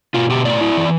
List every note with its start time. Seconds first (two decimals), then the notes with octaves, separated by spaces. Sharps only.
0.14 B2 F4
0.29 B2 G4
0.45 A2 D5
0.61 E4
0.77 E3